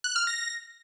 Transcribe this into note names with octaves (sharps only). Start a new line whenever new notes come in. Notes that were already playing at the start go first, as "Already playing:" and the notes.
F#6
F6
A#6